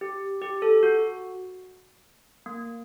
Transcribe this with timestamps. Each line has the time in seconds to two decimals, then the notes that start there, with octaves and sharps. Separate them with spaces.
0.01 G4
0.42 G4
0.62 A4
0.83 F#4
2.46 A#3